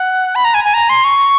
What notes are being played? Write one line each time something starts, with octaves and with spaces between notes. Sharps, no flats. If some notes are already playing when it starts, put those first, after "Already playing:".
Already playing: F#5
B5
A#5
G#5
G#5
A#5
C6
C#6